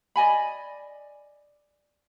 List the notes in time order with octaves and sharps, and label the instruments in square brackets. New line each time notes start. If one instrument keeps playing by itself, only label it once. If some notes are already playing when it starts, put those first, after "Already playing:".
[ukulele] D5 D#5 G#5 B5